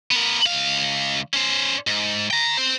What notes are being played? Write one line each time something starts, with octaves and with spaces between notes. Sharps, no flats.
B3 A#4
C#2 F5
C#4 C5
G#2
G5 A#5
C4 C5